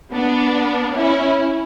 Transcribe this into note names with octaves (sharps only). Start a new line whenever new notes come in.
B3 D4
C#4 E4